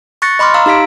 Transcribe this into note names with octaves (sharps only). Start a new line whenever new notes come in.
C#6 F#6 A6 A#6 C#7
D#5 B5 C6 D6 F6
F5 A#5 E6
D#4 G4 F5 B6 D7